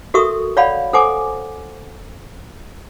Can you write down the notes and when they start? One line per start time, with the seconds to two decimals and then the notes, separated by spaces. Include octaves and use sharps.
0.14 F#4 A4 A#4 E5 C#6 D#6
0.57 C#5 D5 F5 F#5 B5
0.93 A4 C5 F#5 G#5 D6